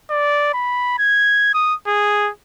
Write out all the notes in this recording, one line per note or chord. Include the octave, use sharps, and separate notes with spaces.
D5
B5
G#6
D#6
G#4